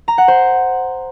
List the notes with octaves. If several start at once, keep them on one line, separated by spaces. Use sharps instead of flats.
A#5
F#5
C5